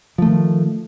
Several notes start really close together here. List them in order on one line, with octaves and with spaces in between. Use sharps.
F3 A3 D#3